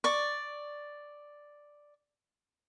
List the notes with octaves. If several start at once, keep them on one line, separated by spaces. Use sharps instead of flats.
D5 C#6